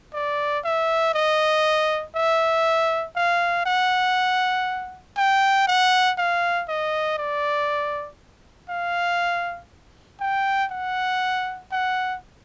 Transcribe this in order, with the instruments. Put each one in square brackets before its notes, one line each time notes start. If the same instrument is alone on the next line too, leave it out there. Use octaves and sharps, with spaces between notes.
[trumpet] D5
E5
D#5
E5
F5
F#5
G5
F#5
F5
D#5
D5
F5
G5
F#5
F#5